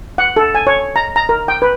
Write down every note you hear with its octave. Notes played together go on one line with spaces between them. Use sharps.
F#5
A4
G#5
C#5
A#5
A#5
A#4
G5
B4